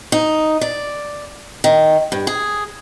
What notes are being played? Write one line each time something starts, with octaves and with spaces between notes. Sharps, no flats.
D#4
D5
D#3
G2
G#4